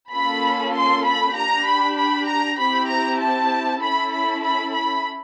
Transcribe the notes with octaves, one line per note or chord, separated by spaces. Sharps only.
A#3 C#4 F4 A4 B5
C6
B5
D4 G4 A#5
B5
B5
A#5
C4 E4 G4 B5
A#5
A5
C#4 E4 A4 B5
B5
B5
B5